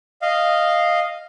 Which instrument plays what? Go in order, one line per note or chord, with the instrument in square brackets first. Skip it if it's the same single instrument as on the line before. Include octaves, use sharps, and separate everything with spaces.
[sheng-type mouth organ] D#5 F5